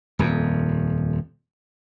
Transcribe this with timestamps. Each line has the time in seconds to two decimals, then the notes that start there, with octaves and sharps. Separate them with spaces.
0.19 D#1 F2